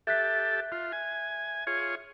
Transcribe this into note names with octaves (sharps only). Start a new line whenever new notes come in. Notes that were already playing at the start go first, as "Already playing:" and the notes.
G4 A4 E5 F#6 B6
F4
G#5
F4 G#4 C#5